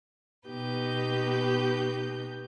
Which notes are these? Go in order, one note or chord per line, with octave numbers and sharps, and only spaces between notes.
B2 B3 D#4 G4 B4 G6